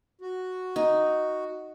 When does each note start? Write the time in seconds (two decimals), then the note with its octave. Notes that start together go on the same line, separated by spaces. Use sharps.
0.21 F#4
0.76 D#4